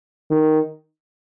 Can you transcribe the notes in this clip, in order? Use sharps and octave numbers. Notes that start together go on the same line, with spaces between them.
D#3